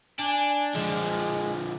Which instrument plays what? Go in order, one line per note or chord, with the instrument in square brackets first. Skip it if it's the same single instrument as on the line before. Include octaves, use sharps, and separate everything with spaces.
[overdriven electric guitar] D4 [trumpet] G#5
[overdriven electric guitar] D3 F3 [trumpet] G#3